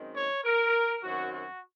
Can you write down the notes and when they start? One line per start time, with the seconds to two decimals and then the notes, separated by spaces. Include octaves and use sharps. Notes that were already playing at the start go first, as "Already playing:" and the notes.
Already playing: F#2 D#3 G#3 C4
0.16 C#5
0.45 A#4
1.03 F#2 D#3 F#3 C4 F#4
1.33 F#4